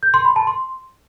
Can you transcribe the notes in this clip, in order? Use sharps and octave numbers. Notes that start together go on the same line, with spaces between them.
G6
C6
B5
A5
C6